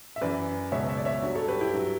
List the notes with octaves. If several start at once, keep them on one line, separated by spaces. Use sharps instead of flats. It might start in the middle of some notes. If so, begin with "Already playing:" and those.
E5
F#2 E3 B4 D5
C#2 B2 F#3 C#5 E5
C#5 E5
D5
C#5 E5
G2 F#3
A4 C#5
G4 B4
E4 G4
G2 F#3